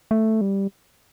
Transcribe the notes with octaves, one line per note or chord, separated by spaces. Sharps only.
A3
G3